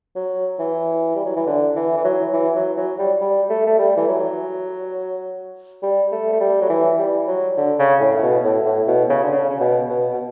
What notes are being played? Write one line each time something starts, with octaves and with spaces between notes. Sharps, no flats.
F#3
E3
G3
F#3
E3
D3
E3
E3
F#3
E3
F#3
F#3
G3
G3
A3
A3
G3
E3
F#3
G3
A3
A3
G3
F#3
E3
G3
F#3
D3
C#3
A2
A2
B2
A2
A2
B2
C#3
D3
C#3
C#3
B2
B2
B2